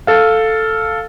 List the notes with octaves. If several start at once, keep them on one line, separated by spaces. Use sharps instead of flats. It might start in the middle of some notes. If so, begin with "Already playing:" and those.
A4 F5